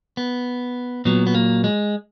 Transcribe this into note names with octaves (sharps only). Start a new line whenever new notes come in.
B3
A#2 F#3 B3
B3
A#3
G#3